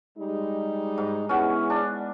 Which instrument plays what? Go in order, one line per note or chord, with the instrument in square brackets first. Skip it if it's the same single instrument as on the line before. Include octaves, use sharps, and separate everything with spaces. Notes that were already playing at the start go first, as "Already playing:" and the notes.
[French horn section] G3 G#3 D#4
[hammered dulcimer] G#2
[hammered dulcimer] B3 C#4 [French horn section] E4 G#4
[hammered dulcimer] D4